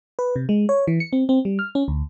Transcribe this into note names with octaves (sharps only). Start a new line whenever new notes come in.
B4
C3
G#3
C#5
E3
C#7
C4
C4
G3
F6
C#4
D2